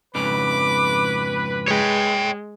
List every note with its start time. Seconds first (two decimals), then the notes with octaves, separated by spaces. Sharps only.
0.15 F2 G#2 C#3 B4 D6
1.68 G#3 C#5 G5